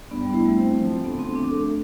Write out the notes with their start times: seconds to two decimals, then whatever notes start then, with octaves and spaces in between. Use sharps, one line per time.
0.11 G2 B3
0.22 G3
0.30 B3
0.33 A3 E4
0.45 G3
0.57 A3 C4
0.80 F3
1.04 D2 B3
1.19 C4
1.27 D2
1.35 D4
1.51 A3